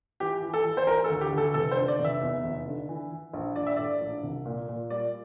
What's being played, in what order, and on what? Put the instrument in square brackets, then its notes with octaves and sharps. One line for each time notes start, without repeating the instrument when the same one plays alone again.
[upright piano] E3 G4
E3
A4
E3
C5
E3 A#4
A4
D2
G4
D2
A4
F1 A4
C5
D3
D5
F1
E5
E2
F1
D3
E3
E3
A#1
A#1 D5
E5
A2 D5
A#1
C2
A#2
A#2
G3 D5